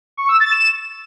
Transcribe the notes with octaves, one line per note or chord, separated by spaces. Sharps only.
C#6
E6
A6
E7